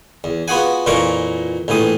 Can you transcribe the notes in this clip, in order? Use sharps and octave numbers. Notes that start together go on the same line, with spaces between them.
E2
B3 F4 F#4 G#4 F#5 G#5
F2 A#2 E3 F4 A#4 C#6
A#1 A2 E3 D#6